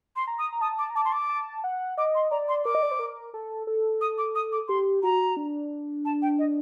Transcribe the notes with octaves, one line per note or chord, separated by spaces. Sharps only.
C6
A#5
D#6
A#5
A5 D#6
D6
A#5
A5 D6
C6
D6
A5
F#5
D#5 D6
C6
D5 A#5
C6
A#4 D6
D#5
D5
C5
A#4
A4
A4
D#6
D6
D#6
D6
G4 C6
F#4 A#5
D4
A5
G5
D#5